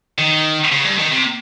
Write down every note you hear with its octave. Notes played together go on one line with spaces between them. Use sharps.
D#3
C#3
G2
D#3
C3